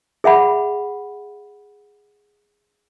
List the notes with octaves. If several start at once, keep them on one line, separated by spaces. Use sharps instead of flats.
G#4 E5 F#5 B5